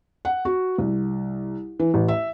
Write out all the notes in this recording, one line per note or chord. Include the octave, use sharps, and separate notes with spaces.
F#5
F#4
C2
E3
A1
E5